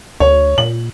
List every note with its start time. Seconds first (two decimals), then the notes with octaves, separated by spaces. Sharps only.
0.20 D2 C#5
0.58 A#2 F#7